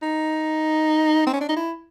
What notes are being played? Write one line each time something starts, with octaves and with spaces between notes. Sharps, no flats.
D#4
C4
C#4
D4
D#4
E4